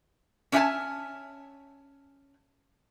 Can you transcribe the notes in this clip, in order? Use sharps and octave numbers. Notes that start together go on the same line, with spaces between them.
C#4 D4 E5 F#5 G#5 A5